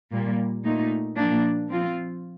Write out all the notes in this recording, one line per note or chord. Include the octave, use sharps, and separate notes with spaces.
A#2 G3 A#3
A#2 A3 D#4
A#2 F3 A#3 D4
F3 C4 F4